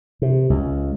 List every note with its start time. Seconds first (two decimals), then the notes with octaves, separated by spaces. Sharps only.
0.22 C3
0.50 C#2